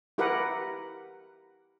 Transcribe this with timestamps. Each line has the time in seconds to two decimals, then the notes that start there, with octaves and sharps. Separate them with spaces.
0.18 E4 G4 A#4 B4 F#5